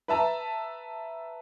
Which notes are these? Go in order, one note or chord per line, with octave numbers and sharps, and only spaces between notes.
B4 E5 A5 A#5